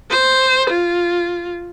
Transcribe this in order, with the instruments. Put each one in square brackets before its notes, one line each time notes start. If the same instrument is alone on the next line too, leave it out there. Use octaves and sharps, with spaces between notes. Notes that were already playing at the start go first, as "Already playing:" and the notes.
[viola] C5
F4